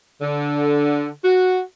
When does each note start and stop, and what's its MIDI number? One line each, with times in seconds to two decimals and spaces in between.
0.21 1.09 50
1.23 1.61 66